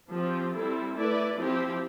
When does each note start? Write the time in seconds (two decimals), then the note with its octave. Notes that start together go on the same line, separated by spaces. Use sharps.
0.10 F3 C4 G4
0.52 G3 C4 E4 A4
0.94 A3 E4 B4 D5
1.36 F3 C4 E4 G4